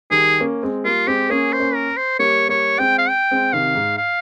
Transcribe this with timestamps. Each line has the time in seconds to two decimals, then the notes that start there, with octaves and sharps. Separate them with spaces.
0.11 D#3 G3 G#4
0.40 A#3 C#4
0.63 G#3 C4
0.85 G3 A#3 F4
1.07 G#3 C4 G4
1.30 A#3 C#4 G#4
1.53 C5
1.60 A#3 C#4
1.75 A#4
1.97 C5
2.19 G3 A#3 C#5
2.49 G3 A#3 C#5
2.78 G#3 C4 G5
2.98 F5
3.09 G5
3.31 G#3 C4
3.53 C3 D#3 F5
3.75 G#2
3.98 F5